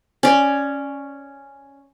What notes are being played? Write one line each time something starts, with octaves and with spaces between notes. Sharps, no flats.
C#4 D5